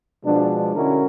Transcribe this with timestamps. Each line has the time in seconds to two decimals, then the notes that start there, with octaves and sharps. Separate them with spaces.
0.25 B2 F3 G#3 D4
0.75 D3 G#3 C#4 E4 F#4 A#4